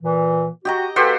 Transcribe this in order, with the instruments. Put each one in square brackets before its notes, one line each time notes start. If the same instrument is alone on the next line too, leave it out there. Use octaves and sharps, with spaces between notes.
[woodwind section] A#2 E3
[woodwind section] F#4 [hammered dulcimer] G4 D#5 A#5
[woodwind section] A#3 A4 B4 [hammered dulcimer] F#4 G4 C5